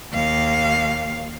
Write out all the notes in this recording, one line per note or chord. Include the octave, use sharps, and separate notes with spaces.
D#2 F5